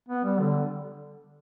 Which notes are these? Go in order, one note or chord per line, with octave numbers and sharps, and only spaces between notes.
B3
G3
D3